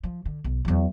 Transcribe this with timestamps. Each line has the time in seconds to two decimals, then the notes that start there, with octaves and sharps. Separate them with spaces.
0.04 F3
0.25 D3
0.44 B1
0.65 E2 F#3